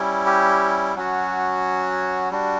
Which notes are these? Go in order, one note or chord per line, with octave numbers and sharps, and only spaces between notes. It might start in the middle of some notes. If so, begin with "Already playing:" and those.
Already playing: G3 C#4 E4
G4
F#3 C#4 F#4
G3 D4 F#4